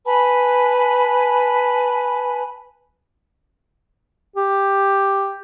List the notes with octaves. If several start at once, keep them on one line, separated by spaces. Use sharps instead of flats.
B4 G#5 A5 B5
G4